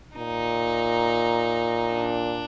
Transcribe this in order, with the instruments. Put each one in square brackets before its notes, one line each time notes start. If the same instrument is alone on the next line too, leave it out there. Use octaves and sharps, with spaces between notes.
[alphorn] A#2 [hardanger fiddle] D#4
[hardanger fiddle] D4